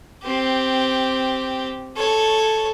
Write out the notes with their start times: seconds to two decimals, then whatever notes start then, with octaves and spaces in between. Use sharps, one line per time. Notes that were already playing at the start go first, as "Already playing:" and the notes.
0.23 C4 G4
1.96 A4 C#5